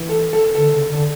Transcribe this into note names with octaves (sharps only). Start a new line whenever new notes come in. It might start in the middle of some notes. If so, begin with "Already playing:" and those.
Already playing: E3
A4
A4
D3 A4
C#3
D3